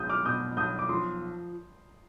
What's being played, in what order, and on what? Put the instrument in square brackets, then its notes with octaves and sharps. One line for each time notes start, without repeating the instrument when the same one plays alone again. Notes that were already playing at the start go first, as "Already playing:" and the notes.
Already playing: [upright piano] B1 G#3 [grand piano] D#6 G6
[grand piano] D6 F6
[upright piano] B2 [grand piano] D#6 G6
[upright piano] B1 [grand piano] D#6 G6
[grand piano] D6
[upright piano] F3 [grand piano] C6 D#6